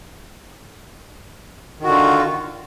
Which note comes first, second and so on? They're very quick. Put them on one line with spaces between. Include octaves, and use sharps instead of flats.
D#3 F#4 D3 F4